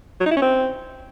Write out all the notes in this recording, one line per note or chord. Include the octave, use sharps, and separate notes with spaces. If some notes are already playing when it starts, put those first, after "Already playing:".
F#3
D#4
E4
C#4
C4